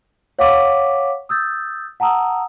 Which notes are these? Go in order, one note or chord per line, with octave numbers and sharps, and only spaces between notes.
C#5 F5 F#5 C#6 D6 B6
D#6 E6 G6 A6
F#5 A5 A#5 D#6 E6